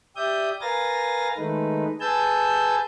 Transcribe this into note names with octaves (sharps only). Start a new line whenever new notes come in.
G4 D5 E5 D#6 G6
A#4 B4 F5 G#5 A6 A#6
D#3 G#3 A3 D#4 B4
G#4 B4 G#5 A5 E6 G6